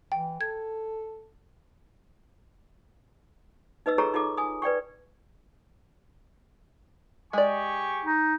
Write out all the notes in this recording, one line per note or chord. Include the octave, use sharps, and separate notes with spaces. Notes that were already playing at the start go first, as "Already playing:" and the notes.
E3 G5
A4 G#6
D#4 B4 D#5 E6
F4 G#4 A4 C#5 A#5 C#6
D#4 F4 G#4 A4 D6
G#5 D#6
B4 D5 G5 C#6
G#3 G4 D5 G#5 C#6
D#4